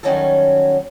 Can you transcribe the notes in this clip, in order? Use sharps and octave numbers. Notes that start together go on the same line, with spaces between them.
D#3 F#3 G3 C#4 F#4 A4